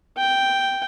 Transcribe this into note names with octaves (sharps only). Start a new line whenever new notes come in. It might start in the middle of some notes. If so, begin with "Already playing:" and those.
G5